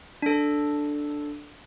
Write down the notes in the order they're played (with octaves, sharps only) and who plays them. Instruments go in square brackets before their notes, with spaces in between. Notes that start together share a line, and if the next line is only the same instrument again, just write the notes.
[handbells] D4 A4